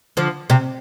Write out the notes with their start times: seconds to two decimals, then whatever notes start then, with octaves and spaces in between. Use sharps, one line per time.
0.17 D3 F3
0.50 C3